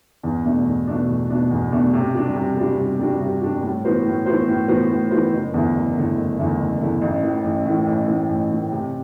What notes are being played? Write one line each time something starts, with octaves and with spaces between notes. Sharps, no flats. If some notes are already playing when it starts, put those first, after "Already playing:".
E2
B2 A3 D4
E2
B2 A3 D4
E2
B2 A3 D4
E2
B2 A3 D4
C3
G3 D4 F#4
C3
G3 D4 F#4
C3
G3 D4 F#4
C3
G3 D4 F#4
A2
E3 B3 F#4 C5
A2
E3 B3 F#4 C5
A2
E3 B3 F#4 C5
A2
E3 B3 F#4 C5
F#1
E2 D3 A3 E4
F#1
E2 D3 A3 E4
F#1
E2 D3 A3 E4
F#1
E2 D3 A3 E4
A1
A2 E3
A1
A2 E3
A1
A2 E3
A1
A2 E3
C3